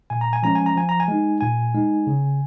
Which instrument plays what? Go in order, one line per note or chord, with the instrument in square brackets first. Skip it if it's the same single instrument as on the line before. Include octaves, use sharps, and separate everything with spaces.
[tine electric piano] A#2 G#5
A#5
G#5
F3 G#3 C#4 A#5
G#5
A#5
F3 G#5
A#5
G#5
G#3 D#4
A#2 G#5
G#3 D#4
C#3